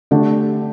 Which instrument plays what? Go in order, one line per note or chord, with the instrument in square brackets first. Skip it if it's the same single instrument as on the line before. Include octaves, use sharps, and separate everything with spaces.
[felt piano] D3 A3 D4 G4